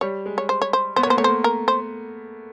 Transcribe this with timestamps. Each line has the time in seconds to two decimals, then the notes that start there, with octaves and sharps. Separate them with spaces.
0.01 G3 C#5
0.26 G#3
0.38 C#5
0.49 C5
0.62 C#5
0.73 C5
0.96 B3 C5
1.03 C#5
1.07 A#3 C5
1.17 A3 C#5
1.24 A#3 C5
1.44 A#4
1.68 C5